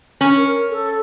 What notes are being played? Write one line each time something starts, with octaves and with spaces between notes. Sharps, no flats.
C#4
A#4
A4